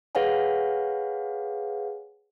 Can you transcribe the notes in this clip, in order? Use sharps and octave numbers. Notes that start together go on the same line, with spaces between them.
G#4 B4 C#5 F5 F#5 G#5